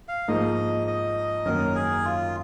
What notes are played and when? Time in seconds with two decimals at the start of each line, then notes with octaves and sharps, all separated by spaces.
0.08 F5
0.28 G#2 F3 A#3 D#4 D#5
0.87 D#5
1.45 F#2 D#3 F#3 A#3 C#4 A#4
1.75 G#4
2.05 F4